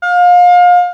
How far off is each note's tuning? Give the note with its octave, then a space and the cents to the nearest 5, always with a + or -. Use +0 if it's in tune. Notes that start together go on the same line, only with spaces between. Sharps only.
F5 +30